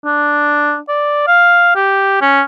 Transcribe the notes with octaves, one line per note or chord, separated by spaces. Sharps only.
D4
D5
F5
G4
C#4